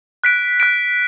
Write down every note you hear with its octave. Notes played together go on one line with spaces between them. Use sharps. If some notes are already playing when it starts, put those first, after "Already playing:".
F#6 B6 D7
F#6 B6 D7